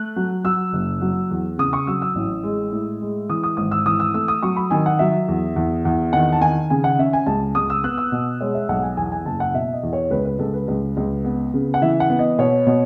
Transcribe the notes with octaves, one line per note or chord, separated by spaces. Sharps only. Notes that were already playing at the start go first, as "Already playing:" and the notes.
Already playing: A3 F#6
F#3
F#3 E6
F#1
F#3
E2
C#3 D#6
C#6
F#3 E6
E6
A1
G#3
A2
G#3
E3 D#6
D#6
G#1 D#6
E6
E3 D#6
E6
A3 E6
D#6
F#3 C#6
B5
D#3 G#5
F#5
F#3 E5
E2
E2
E2
D#3 F#5
A5
D#3 G#5
C#3 G#5
F#5
C#4 E5
G#5
C#2 A5
C#2 D#6
E6
B3 F#6
E6
B2
G#3 C#5
E5
B1 F#5
G#5
E2 G#5
G#5
F#1 A5
F#5
B2 E5
D#5
E2
C#5
C#2 B4
B4
C#2 A4
B4
C#2
C#2
B3
C#3
F#5
E3 E5
F#5
B3
D#5
B2 C#5
B2